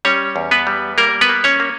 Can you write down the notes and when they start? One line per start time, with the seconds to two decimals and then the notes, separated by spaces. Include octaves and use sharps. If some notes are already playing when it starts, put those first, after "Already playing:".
0.05 G3 C#4 C#5
0.36 E2
0.51 B3 B4
0.67 G3
0.98 G3 A#3 A#4
1.21 B3 B4
1.29 A#3
1.44 C#4 C#5
1.60 A#3